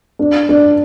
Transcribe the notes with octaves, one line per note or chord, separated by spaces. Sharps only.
D4
D4